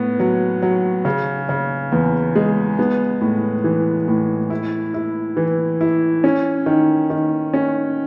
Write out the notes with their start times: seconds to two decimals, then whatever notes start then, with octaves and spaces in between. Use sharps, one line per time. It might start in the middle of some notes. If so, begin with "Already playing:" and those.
Already playing: A2 B3
0.20 F#3
0.62 F#3
1.05 C#3
1.49 C#3
1.92 E2
2.35 G#3
2.79 B3
3.21 A2
3.64 E3
4.08 A2
4.50 E4
4.94 E4
5.37 E3
5.81 E4
6.24 C#4
6.66 D#3
7.10 D#3
7.54 C#4